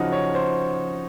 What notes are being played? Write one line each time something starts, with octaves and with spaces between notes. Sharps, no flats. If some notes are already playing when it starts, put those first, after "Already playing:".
Already playing: C#3 F3 D#4 F#4
C#5
C5